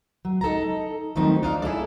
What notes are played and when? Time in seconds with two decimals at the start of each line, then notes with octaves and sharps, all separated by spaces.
0.25 F#3
0.41 D#4 A4 A5 A#5
1.16 D#3 F3 F#3 A3 C4 D#4
1.43 D4 D#4 F5
1.62 E4 G#4 A4 D5